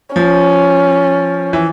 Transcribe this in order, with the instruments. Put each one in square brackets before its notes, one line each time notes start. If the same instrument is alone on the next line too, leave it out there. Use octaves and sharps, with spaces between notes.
[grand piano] F3 [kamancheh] C#4
[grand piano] E3